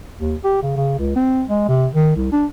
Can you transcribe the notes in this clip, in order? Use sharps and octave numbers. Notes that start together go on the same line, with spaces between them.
D#2
G4
C#3
C#3
C#2
C4
G#3
C3
D#3
C2
D4